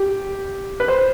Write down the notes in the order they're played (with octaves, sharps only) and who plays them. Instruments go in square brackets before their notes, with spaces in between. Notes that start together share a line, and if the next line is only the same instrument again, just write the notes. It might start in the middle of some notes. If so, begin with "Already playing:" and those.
Already playing: [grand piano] G4
B4
C5